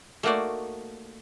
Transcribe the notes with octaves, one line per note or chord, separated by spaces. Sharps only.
A3 A#3 D#4 F#4 C5 D5